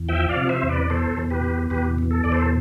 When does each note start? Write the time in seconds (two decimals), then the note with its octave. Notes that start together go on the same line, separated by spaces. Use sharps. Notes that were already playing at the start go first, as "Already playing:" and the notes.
Already playing: E2
0.09 F3 E5 G5
0.29 D5 F5
0.36 C3
0.49 C5 E5
0.63 E2
0.69 B4 D5
0.82 D5
0.90 B2 A4 C5
1.17 E2
1.30 G4 B4
1.44 B2
1.70 E2 G4 B4
1.98 B2
2.11 A4
2.24 E2 D5
2.32 A4 C5